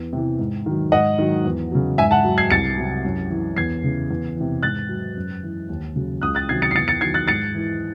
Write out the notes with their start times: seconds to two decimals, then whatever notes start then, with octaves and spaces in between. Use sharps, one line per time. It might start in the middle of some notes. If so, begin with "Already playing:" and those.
Already playing: E2
0.13 C3 E3
0.39 G#2
0.66 D#3 F#3
0.92 G#2 D#5 F#5
1.19 D#3 F#3
1.45 E2
1.72 C#3 F#3
1.98 G#2 E5 G#5
2.11 F#5 A5
2.24 F#3
2.38 G#6 C7
2.50 C2 A6 C#7
2.78 C3 F#3
3.05 F#2
3.30 E3
3.56 E2 G#6 C7
3.84 C#3 E3
4.11 E2
4.37 C3 E3
4.63 G#2 F#6 A6
4.89 F#3
5.16 F#2
5.43 E3
5.69 D#2
5.96 C#3 F#3
6.22 C#2 D#6 F#6
6.35 F#6 A6
6.49 C3 D#3 F#3 G#6 C7
6.62 A6 C#7
6.71 C7
6.75 E2 A6 C#7
6.88 A6 C#7
7.01 D#3 F#3 G#6 C7
7.14 F#6 A6
7.28 G#2 A6 C#7
7.55 E3